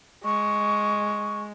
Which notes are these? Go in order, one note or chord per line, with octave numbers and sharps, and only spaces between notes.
G#3 C#6